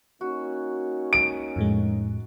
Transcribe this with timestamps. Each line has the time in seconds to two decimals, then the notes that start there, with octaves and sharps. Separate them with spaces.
0.21 A#3 C#4 D#4 F#4
1.13 D7
1.56 F2 A2 G#3